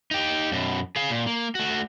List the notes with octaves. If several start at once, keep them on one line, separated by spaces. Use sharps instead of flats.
D#4 G4
F#2 B2
G#4 F5
A#2
A#3
A3 F#4